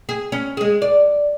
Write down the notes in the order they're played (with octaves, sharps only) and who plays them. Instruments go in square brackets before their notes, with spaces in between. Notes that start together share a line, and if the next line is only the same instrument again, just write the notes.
[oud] G#4
C#4
G#3 G#4
D5